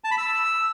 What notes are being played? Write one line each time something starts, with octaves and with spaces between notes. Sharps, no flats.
A5
B5
E6